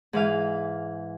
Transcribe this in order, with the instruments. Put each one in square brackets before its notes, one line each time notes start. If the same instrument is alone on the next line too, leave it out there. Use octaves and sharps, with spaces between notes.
[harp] G#2 E3 F5